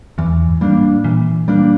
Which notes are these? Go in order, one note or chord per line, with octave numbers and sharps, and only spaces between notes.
E2 E3
G#2
G3 A#3 D4
A2
A#2 E3
G3 A#3 D4